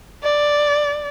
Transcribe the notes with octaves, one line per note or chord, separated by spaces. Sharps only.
D5